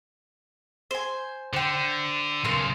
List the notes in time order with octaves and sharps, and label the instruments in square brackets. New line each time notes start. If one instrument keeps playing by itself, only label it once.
[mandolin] C5 G#5
[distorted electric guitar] D3 [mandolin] C5 G5
[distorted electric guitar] B1 C#3 [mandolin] A#4 C6